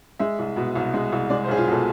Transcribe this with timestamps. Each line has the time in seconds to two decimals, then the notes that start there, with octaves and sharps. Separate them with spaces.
0.19 G#3 E5
0.39 C2
0.56 B2
0.75 C2
0.94 G#3
1.12 C2
1.30 G#3 D5
1.44 C5
1.48 B1 G#4
1.57 F4
1.67 B2 A4